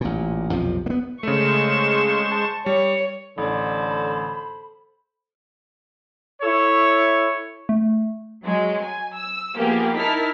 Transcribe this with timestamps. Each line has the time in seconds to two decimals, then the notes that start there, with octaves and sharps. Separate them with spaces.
0.01 A1 A#2
0.51 B1 F2 C3 F3
0.86 A#3 B3
1.23 C#3 G#3 A3 C5 C#6 E7
2.32 A5
2.66 G3 C#5
3.38 A1 D3 A4 C5 B5
6.42 E4 A4 C#5
7.69 A3
8.44 F#3 G#3
8.85 G#5
9.15 E6
9.55 F3 A#3 B3 G4 G#4
9.96 D#4 E4 A#4 A5 F6 B6